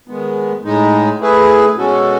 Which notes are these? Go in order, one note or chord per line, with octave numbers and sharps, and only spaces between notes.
D#3 G#3 B3
A2 G#3 D#4
A3 E4 G#4 B4
B2 G#3 C#4 F#4 A4